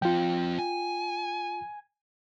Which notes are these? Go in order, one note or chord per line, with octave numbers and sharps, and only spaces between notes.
F3 C4 F4 G5
G#5